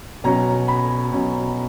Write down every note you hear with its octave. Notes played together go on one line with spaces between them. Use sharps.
B2 F#3 C#4 A#5
B5
B2 F#3 C#4